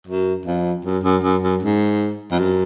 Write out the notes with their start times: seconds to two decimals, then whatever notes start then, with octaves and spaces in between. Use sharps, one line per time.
0.07 F#2
0.46 F2
0.85 F#2
1.03 F#2
1.23 F#2
1.42 F#2
1.62 G#2
2.31 F2
2.39 F#2